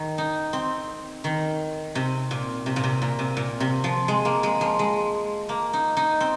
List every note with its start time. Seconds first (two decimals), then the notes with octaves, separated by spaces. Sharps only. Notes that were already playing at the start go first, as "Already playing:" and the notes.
Already playing: D#3
0.18 D#4
0.53 C4
1.24 D#3
1.95 C3
2.31 A#2
2.66 C3
2.76 A#2
2.84 C3
3.02 A#2
3.19 C3
3.37 A#2
3.60 C3
3.84 F3
4.08 G#3
4.25 A#3
4.43 G#3
4.61 F3
4.79 G#3
5.49 A#3
5.73 D#4
5.97 D#4
6.20 C4